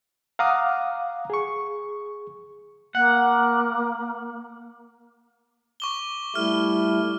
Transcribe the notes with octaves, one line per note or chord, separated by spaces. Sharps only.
F5 F#5 A#5 D6 D#6 F6
G#4 C#6
A#3 F#5
C#6 D6 G7
G3 A3 E4 F6